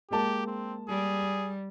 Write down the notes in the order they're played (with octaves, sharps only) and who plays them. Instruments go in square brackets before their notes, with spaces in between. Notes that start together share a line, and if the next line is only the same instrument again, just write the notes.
[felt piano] G#3 A#3 A5 [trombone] G4
[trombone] C4
[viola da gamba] G3 [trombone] G#4